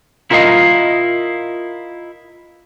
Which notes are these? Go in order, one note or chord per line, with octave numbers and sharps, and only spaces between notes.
E4 F4 A#4 B4 D#5 F5